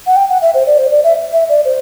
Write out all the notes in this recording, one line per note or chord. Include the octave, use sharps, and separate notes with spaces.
F#5
G5
F#5
E5
C5
D5
C5
D5
E5
E5
D5
C5